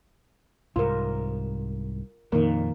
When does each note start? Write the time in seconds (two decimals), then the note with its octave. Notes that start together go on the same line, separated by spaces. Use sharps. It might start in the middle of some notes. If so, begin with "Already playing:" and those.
0.76 C2 G#2 F4 A#4
2.32 F2 A#2 D#3 A#3